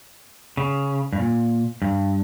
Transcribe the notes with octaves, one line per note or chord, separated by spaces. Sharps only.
C#3
G2
A#2
G2